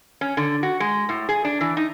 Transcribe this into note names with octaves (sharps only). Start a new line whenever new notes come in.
C#4
D3
F#4
G#3
A2
G#4
D4
E3
D#4